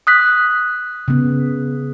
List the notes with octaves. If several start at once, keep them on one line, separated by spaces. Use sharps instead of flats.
D#6 F#6 B6
C#3 B3